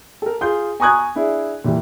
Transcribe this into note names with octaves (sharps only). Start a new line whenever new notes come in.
A4 A#4
F4 G#4 G6
G#5 A#5 C#6 D#6 F#6 G#6
D4 E4 G#4
A#2 E3 G3